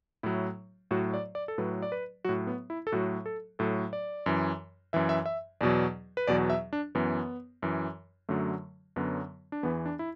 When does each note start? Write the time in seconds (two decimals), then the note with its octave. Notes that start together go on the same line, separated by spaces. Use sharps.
0.23 A2 F#3 E4
0.91 A2 F#3 F#4
1.14 D5
1.35 D5
1.48 A4
1.58 A2 F#3 B4
1.82 D5
1.92 B4
2.24 A2 F#3 F#4
2.47 B3
2.70 E4
2.87 A4
2.92 A2 F#3 F#4
3.26 A4
3.59 A2 F#3 A4
3.93 D5
4.26 F#2 E3
4.93 F#2 E3 E5
5.09 E5
5.26 E5
5.61 E2 B2 F#3 D5
6.17 B4
6.27 E2 B2 F#3 D5
6.50 E5
6.73 D4
6.95 F#2 E3 B3
7.63 F#2 E3
8.29 F#2 D3 F#3 A3
8.96 F#2 D3 F#3 B3
9.52 D4
9.63 E2 E3 B3
9.86 D4
9.99 E4